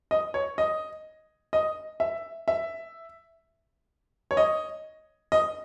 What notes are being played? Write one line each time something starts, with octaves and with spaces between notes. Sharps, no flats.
D#5
C#5
D#5
D#5
E5
E5
C#5
D#5
D#5